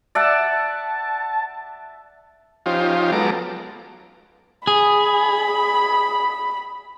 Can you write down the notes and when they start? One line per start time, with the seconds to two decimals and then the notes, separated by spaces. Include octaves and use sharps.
0.15 D5 E5 F#5 A5
2.66 F3 C#4 D#4 F4 G4 C5
3.12 F#3 G#3 B3 A4 A#5 D6
4.67 G#4 B5